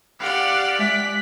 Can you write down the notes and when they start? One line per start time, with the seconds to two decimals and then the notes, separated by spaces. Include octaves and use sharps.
0.20 G4 D5 F5 F#5
0.79 G#3 E5 F#6 B6